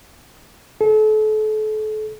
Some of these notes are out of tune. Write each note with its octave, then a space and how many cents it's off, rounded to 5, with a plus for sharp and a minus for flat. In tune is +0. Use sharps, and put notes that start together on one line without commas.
A4 -35